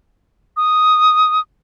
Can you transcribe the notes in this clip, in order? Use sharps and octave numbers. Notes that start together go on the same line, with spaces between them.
D#6